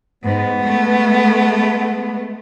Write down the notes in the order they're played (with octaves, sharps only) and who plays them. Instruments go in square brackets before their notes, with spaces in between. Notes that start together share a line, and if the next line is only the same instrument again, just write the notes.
[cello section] G#2 [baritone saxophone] B3
[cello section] G#3 A3